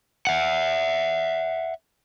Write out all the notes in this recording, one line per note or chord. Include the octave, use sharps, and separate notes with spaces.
E5 F#5